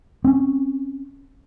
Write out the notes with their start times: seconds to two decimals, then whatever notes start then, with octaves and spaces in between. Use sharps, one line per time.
0.24 C4 C#4